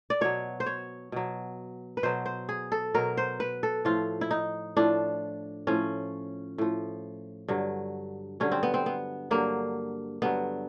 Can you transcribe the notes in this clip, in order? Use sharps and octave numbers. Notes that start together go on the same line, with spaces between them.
D5
B2 F#3 C#5
C5
C#5
B2 F#3
B4
B2 F#3 C5
C5
G#4
A4
B2 F#3 A#4
C5
B4
A4
A2 F3 F4
E4
D#4
A2 F3 D4
A2 F3 C#4
A2 F3
G2 D3 F#3
G2 D3 F#3 C#4
C4
B3
C4
B3
G2 D3 F#3 A#3
G2 D3 F#3 B3